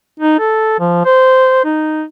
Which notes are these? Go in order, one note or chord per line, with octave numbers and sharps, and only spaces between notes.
D#4
A4
F3
C5
D#4